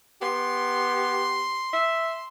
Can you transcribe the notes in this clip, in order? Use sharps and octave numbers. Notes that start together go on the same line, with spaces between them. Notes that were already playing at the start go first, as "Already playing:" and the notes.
B3 G4 C6
E5